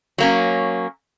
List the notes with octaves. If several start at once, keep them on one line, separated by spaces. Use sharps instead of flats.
F#3 A#3 C#4